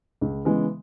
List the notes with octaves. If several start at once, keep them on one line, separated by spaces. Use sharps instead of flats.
C#2
C#3 E3 G#3 B3